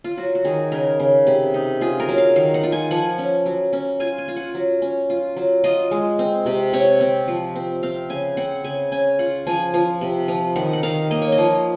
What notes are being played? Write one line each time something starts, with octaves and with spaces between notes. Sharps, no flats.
F4
F#3 F#4
F#4
D#3 G#4
C#3 A#4
C#3
C3
D#4
F4 G#4
A#4
F#3
F5
D#3 F5
F#5
F4
G#5
F3 F#5
C#4
F#3
C#4
F4 G#5
G#5
F4
F#5
F#3
C#4
F4
F#3
F4 D#5
G#3
C4
C3
C4 C#5
C4
F3
C4
C4 F5
C#3 G#5
C4 F#5
C#3 G#5
C#4 G#5
F4 F#5
F3 G#5
F3
C3
F3
D#3 F#5
F#5
D#3 F5
A#3 D#5
C#5
D#5
F3